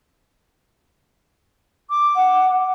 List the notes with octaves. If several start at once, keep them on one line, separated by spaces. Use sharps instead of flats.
D6
F#5